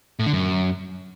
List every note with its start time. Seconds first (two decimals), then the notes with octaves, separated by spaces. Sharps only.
0.19 A2
0.26 D3
0.33 F#2